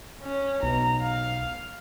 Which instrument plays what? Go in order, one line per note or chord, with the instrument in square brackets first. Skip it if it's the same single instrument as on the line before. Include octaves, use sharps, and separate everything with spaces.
[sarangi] C#4
[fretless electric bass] B1 B2 [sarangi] A#5
[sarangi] F5